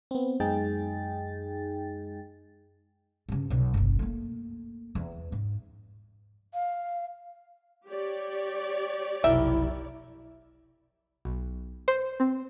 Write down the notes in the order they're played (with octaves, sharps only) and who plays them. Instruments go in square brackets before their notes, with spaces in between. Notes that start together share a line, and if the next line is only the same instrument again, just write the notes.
[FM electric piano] B3 C4
F#2 G#3 D#4 G#4 G5 A6
[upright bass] G2 C#3
B1 B2
F#1 B1
A3 A#3
E2
G#2
[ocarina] F5
[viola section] G4 C#5 D5
[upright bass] F1 B1 [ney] E4 [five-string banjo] A#4 E5 G5
[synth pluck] B1
C5
C4